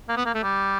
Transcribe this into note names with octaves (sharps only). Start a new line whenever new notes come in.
A#3
B3
A#3
A3
G3